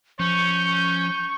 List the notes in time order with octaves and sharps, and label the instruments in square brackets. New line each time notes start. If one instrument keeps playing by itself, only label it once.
[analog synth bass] F3 [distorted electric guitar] C#4 [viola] C#6 [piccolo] G6